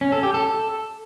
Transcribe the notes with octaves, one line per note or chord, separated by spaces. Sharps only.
C#4
A4
G4
A4